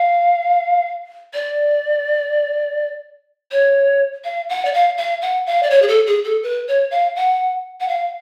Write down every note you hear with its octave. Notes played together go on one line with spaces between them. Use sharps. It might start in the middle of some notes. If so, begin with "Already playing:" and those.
Already playing: F5
D5
C#5
F5
F#5
D5
F5
F5
F#5
F5
D5
C#5
G#4
A4
G#4
A4
B4
C#5
F5
F#5
F#5
F5